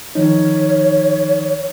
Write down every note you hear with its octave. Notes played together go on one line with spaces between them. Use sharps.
D#3 F3 D#4 C#5